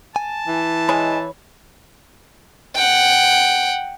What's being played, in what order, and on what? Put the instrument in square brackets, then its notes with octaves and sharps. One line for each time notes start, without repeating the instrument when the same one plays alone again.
[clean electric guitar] G#5 [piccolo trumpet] A5
[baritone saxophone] E3
[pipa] G#3 [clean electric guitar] C#5 B5
[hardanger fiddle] F#5 G5